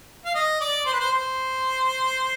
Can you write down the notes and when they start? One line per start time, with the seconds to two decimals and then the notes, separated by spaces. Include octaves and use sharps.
0.25 F5
0.35 D#5
0.61 D5
0.86 C5
0.93 B4
1.00 C5
1.12 C5